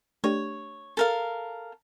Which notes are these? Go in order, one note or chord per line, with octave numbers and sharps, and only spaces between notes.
A3 D4 G4 C#5
A4 A#4 F5